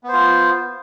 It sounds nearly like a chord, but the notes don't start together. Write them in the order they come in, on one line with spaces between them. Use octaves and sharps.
B3 C5 F4